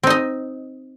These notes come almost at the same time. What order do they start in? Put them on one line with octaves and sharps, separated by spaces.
C4 D#4 D#5